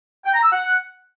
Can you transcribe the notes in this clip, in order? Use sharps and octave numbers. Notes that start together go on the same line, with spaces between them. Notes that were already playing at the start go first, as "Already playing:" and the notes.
G5
A#5
E6
F#5